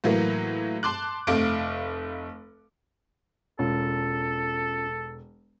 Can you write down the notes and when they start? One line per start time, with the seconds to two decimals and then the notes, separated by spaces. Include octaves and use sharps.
0.04 A2 E3 F#3 A#3
0.83 A5 C6 D6 F#6
1.27 F1 A3 F5 D6 D7
3.59 E1 C#4 F4 A4